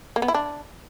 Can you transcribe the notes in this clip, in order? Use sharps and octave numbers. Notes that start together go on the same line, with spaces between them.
A#3
B3
E4
D4